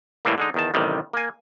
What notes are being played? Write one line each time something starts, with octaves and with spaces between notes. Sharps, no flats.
A2 E3 G3 A3 A#3
D3 G#3 D#4
E2 D#3 A5
A1 C3 D#3 G3
A#3 G#5